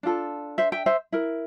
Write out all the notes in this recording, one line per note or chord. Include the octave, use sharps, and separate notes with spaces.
D4 F4 A4
C5 E5
E5 G5
C5 E5
E4 A#4